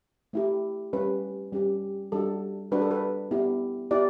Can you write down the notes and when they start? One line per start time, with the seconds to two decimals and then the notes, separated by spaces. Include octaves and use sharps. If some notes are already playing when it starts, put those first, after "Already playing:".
0.33 A3 E4 G4
0.93 G3 C#4 G4 B4
1.53 G3 C#4 G4
2.12 G3 D4 F#4 A4
2.71 G3 D4 F#4 B4
2.81 A4
2.91 B4
3.31 B3 E4 G4
3.90 B3 E4 G4 D5